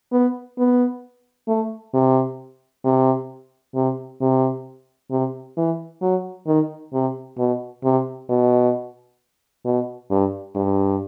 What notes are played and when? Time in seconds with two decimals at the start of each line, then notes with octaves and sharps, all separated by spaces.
0.12 B3
0.58 B3
1.48 A3
1.94 C3
2.85 C3
3.75 C3
4.21 C3
5.11 C3
5.57 E3
6.02 F#3
6.47 D#3
6.93 C3
7.38 B2
7.84 C3
8.29 B2
9.65 B2
10.11 G2
10.55 G2